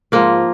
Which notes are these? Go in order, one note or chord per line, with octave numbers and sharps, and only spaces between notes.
G#2 F3 A#3